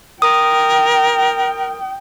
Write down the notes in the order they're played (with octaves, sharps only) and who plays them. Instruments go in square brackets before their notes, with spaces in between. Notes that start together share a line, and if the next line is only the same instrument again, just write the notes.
[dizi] A#4 [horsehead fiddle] G5 [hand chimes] D#6